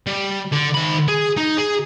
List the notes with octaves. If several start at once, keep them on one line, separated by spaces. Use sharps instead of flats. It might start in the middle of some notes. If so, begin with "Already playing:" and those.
G3
D3
D#3 B5
G#4
D#4
G#4